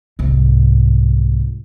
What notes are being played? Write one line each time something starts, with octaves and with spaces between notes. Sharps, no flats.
C2 G#2